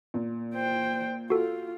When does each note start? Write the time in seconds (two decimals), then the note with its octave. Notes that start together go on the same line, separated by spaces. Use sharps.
0.14 A#2
0.55 C5 G5
1.30 F4 F#4 A4